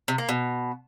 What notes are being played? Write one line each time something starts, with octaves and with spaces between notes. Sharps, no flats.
C3
A#3
B2